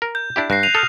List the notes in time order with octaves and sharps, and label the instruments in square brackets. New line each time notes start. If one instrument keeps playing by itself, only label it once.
[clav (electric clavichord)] A#4
[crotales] G6
[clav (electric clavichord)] D4 E4 G4
[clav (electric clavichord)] G2 [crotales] F#6 A#6 C7
[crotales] C7 D#7 F7
[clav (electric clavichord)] A4 [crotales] D#6 F6 G6